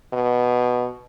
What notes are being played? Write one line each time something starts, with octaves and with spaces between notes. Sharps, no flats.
B2